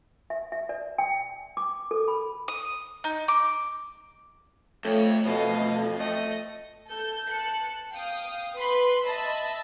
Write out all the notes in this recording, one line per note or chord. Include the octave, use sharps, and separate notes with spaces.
E5
E5
D5
G5
D6
A4
B5
D#6
D#4
D6
F2 A3 C#5
B2 D#5 F5
A3 D#5
A4 G6
A5 F#6 C#7
F5 G5 D#6
B4 B5 C6
D#5 E5 A5 B5 E6